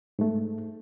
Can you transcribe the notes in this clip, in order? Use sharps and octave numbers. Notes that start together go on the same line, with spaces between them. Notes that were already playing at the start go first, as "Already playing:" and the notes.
G#2 A3